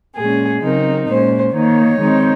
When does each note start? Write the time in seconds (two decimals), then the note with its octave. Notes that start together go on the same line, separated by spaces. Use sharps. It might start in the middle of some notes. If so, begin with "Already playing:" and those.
0.16 A#2 G#3 C#4 G#4
0.62 C#3 F#3 C4 D#4 A#4
1.08 A#2 G#3 C#4 C5
1.54 D#3 A#3 D#4 C#5
2.00 D#3 G#3 C4 D#4